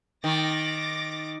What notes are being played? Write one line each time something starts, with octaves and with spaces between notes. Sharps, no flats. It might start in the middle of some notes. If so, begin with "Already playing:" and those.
D#3 D6 A6 A#6